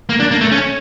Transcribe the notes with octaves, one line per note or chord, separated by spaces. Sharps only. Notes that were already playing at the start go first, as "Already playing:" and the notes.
A#3
D4
A#3
A3
C#4